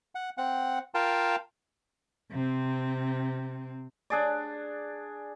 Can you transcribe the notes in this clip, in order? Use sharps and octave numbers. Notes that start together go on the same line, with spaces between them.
F#5
C4 F#5
F4 A#4 F5 G5 A5
C3 C4
D4 G#4 D5